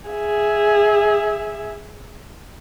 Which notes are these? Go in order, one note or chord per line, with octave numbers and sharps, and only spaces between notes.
G#4 E5